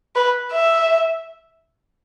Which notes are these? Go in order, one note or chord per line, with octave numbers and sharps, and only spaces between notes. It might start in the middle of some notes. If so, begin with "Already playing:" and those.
B4
E5